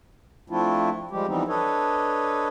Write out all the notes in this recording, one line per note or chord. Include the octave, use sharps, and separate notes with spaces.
F3 A3 C4 D4 E4 F4
F3 G3 G#3 G4
E3 F3 G3 B3 C4 D#4
D4 A4 B4 C#5 D#5